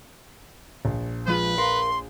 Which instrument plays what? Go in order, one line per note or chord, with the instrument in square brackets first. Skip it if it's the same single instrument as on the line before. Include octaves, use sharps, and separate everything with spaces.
[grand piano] A#1
[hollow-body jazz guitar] F3 G#3 F4 [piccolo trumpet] B4
[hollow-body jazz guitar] A#4 F5 [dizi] C6